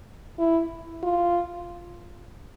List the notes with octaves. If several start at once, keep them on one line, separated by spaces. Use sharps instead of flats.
E4
F4